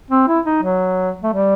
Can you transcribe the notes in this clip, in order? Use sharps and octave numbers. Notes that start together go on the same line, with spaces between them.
C4
E4
D#4
F#3
A3
G3